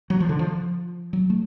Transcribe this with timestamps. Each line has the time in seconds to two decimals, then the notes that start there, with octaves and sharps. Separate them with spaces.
0.10 F#3
0.20 F3
0.29 D3
0.39 F3
1.13 F#3
1.30 A3